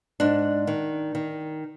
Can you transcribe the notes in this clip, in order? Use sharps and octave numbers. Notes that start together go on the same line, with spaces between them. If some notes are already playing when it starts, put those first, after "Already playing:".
G#2 D4
D#3
D#3